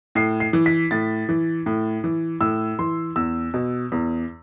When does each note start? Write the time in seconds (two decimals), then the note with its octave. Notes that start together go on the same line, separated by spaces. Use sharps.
0.15 A2 C7
0.40 C7
0.53 E3
0.66 B6
0.91 A2 A6
1.29 E3
1.66 A2
2.04 E3
2.41 A2 E6
2.79 E3 C6
3.16 E2 E6
3.54 B2
3.92 E2